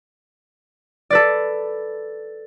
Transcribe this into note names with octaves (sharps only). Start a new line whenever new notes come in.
A4 B4 D5